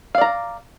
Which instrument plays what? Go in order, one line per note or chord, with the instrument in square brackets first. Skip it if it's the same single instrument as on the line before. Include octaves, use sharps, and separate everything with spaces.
[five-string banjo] F5
D5
A#5